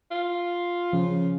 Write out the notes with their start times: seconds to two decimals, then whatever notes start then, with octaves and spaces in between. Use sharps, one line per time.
0.11 F4
0.93 C#3 F3